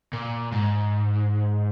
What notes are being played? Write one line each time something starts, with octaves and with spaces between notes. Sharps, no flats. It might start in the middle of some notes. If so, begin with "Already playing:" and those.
A#2
G#2